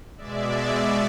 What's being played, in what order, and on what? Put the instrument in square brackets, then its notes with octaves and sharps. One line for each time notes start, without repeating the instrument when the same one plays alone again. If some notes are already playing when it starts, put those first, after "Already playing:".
[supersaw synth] B2 G#3 D5 E5